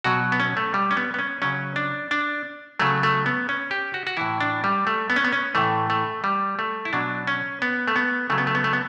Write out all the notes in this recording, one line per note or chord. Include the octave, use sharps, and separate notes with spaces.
B2 F#3 F#4
B3
C#4
A3
G3
C#4
B3
B3
C#4
C#3 F#3 C#4
D4
D4
C#3 F#3 A3
A3
B3
C#4
G4
F#4
F#4
A2 E3 E4
D4
G3
A3
B3
C#4
B3
C#4
A2 E3 A3
A3
G3
A3
E4
B2 F#3 D4
C#4
B3
A3
B3
C#3 F#3 A3
B3
A3
B3
A3
B3